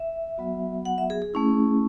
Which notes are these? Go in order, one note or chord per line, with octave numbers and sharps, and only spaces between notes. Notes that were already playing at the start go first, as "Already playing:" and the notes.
Already playing: E5
F#3 B3 F#4
F#5
E5
G#4
G#4
A3 C#4 E4